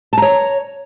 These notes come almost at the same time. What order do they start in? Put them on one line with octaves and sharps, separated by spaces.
A5 A#5 C#5